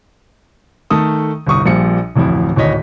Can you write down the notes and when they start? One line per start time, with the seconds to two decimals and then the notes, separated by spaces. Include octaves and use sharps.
0.90 D#3 A3 A4 D#6
1.47 G1 C2 C#6 D#6
1.66 A#1 A#2 F3 G3 C#7
2.16 D1 A1 F2 E4
2.56 D1 G#1 C#5 D#5 B6